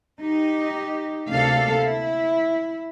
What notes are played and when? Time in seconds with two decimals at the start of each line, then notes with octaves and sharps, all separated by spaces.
0.21 D#4 G4
1.29 D2 C3 A#3 D4 A4 F5
1.80 E4